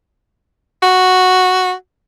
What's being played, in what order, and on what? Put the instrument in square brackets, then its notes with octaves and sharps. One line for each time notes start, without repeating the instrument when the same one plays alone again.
[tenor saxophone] F#4